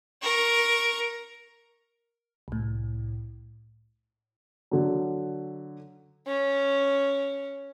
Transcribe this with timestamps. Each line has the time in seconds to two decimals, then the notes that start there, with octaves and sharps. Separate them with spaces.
0.22 A#4 C#6
2.48 C2 A2
4.71 D3 F#3
6.27 C#4